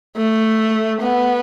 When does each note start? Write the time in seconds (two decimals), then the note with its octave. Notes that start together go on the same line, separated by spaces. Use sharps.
0.17 A3
1.02 B3